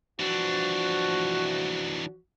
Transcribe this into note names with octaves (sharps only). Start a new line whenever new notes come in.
E3 F3 D4 F#4